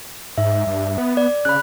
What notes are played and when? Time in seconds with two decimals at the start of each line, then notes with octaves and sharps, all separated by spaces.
0.38 G#2 E5
0.67 G2
0.98 B3
1.17 D5
1.45 C#3 B5 F#6